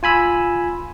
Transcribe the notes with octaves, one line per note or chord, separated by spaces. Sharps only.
F4 G#5 B5 E6